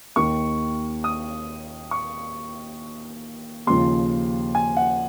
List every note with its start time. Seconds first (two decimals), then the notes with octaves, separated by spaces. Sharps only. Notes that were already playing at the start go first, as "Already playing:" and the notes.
0.16 D#2 D#3 C#6
1.04 D#6
1.91 C#6
3.67 D#2 C#3 F3 C6
4.55 G#5
4.77 F#5